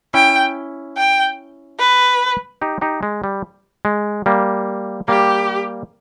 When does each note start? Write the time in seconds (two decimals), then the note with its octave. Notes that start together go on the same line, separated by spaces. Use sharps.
0.14 C#4 E4 G5
0.97 G5
1.79 B4
2.61 D#4 G4
2.81 D#4 G4
3.03 G#3
3.24 G3
3.85 G#3
4.26 G3 A#3
5.08 G3 A#3 G4